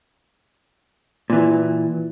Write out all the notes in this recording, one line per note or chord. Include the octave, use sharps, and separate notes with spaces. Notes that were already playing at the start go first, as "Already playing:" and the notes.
A#2 E3